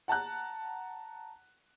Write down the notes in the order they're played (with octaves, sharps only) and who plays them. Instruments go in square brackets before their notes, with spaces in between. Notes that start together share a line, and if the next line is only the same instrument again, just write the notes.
[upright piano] F#5 A5 A#5 F#6